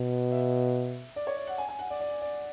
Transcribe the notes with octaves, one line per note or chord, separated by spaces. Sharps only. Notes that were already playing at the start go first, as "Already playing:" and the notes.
Already playing: B2
E5
D5
C#5
D5
F#5
G#5
G#5
F#5
D5
D5
D5